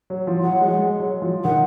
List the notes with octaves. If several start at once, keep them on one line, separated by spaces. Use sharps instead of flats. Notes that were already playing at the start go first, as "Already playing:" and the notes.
F#3
F3
F3
F#3 F#5
G#3
G#3
F#3
F3
D#3 F#5